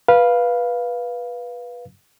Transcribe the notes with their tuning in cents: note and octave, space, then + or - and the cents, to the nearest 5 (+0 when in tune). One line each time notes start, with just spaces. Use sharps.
B4 -15 F5 +0